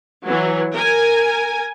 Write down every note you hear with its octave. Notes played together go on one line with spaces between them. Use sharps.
E3 F#3
A#4 G#5